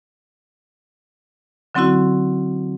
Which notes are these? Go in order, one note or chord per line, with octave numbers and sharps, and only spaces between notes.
D3 F#3 C4 C#4 E4 F#4